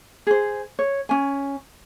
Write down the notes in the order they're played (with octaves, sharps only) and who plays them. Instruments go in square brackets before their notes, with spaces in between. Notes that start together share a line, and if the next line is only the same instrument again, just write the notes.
[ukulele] G#4 C5
C#5
C#4 G#5